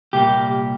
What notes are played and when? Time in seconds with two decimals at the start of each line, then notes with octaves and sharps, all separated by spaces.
0.13 C2 A#2 G3 A#3 G4